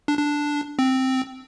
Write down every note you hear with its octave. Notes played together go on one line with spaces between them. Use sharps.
D4
D4
C4